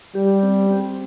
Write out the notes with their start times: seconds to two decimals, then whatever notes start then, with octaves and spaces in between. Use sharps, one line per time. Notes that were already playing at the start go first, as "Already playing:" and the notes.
0.15 G3 G4
0.43 C4
0.71 C4